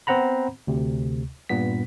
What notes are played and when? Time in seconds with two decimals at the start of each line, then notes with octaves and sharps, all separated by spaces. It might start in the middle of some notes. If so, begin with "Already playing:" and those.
0.07 B3 C4 C5 F#5 A#5 B5
0.67 D2 C3
1.49 G2 A#2 B3 B6